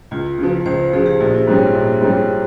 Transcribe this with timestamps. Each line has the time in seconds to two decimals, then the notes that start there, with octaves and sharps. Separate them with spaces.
0.11 C#2 F4
0.38 C#3 F3
0.66 C#2 C5
0.93 C#3 F3 G#4
1.06 G4
1.20 A#1
1.47 G#2 G3 C#4
1.74 A#1
2.01 G#2 G3 C#4